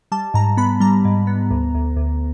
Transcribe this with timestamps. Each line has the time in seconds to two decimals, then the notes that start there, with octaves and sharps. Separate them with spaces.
0.12 G3 A5
0.34 G#2 A#5
0.57 B3 B5
0.80 G3 A#5
1.05 G#2
1.27 B3
1.51 D2
1.75 D2
1.97 D2